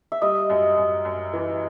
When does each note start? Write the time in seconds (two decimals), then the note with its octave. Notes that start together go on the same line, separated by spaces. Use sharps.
0.12 E5
0.21 G3 D#5
0.50 F#2
0.77 F#2
1.05 F#2
1.33 E3